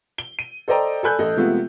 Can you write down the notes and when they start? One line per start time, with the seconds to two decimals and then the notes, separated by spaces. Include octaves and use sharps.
0.18 G7
0.39 D#7
0.68 A4 C5 D5 D#5 G5 A#5
1.03 A4 D5 G#5 B5 F#6 G6
1.19 A1 A4 D#5
1.36 C3 F3 G#3 A3 B3 F4